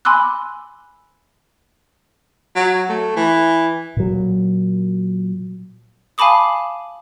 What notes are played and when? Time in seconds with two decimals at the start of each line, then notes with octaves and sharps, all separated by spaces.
0.05 G#5 B5 C6 D6 E6 F#6
2.56 F#3
2.89 A3
3.16 E3
3.97 A#2 F#3
6.18 F5 G#5 A5 B5 D6 D#6